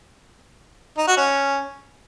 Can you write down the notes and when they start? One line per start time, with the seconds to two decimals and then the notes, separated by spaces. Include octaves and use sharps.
0.97 D#4
1.07 F#4
1.17 C#4